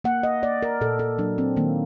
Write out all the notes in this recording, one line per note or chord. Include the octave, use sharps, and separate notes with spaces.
A#3 F#5
D#5
A#3 D5
A#4
A#2 A4
A4
F#3 D4
C4
D#3 A#3